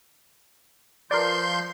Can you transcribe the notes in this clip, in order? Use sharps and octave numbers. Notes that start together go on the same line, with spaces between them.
F3 A#4 B4 D5 C6 G6